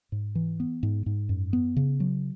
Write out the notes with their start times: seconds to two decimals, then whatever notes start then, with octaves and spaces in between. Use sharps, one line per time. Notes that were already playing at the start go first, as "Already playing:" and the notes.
0.12 G#2
0.35 E3
0.60 B3
0.83 G#2
1.06 G#2
1.29 F#2
1.53 B3
1.76 C#3
2.00 F#3